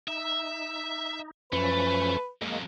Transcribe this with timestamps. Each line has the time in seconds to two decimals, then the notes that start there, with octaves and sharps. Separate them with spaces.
0.08 D#4 E5
1.53 F#2 F3 A3 C#4 B4
2.42 F2 F#3 G#3 A#3